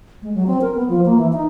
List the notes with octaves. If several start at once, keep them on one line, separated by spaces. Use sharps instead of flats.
G#3
F#3
C4
A#4
B3
F3
A#3
E3
D#4